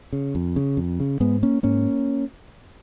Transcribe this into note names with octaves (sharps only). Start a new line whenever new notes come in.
C#3
F2
C#3
F2
C#3
G#2 G#3 B3
A#3 C#4
G#2 A#3 C#4